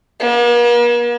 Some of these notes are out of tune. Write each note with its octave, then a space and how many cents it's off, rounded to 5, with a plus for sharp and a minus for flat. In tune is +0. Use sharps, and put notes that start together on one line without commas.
A#3 +45